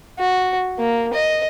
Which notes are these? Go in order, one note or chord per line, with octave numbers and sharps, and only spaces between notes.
F#4
A#3
D#5